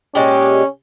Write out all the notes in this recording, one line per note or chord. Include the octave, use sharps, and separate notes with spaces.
A#2 G#3 C#4 G4